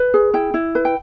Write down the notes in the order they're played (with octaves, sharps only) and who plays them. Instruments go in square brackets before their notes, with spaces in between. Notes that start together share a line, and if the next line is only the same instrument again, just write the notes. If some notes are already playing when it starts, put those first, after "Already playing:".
Already playing: [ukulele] B4
G#4
E4 G5
E4
B4
G5